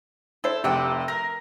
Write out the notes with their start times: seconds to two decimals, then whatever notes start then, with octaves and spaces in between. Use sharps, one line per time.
0.44 E4 A4 C5
0.64 F1 C3 D5 F#5 G5
1.08 A#4 A#6